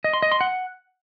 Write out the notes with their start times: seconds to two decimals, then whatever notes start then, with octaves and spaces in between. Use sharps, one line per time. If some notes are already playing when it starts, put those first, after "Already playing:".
0.04 D#5
0.13 C6
0.23 D#5
0.32 C6
0.41 F#5